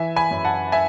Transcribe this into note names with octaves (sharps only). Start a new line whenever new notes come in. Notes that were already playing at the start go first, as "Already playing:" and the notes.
Already playing: E3 E5 G#5
G#5 B5
F#2
F#5 A5
E5 G#5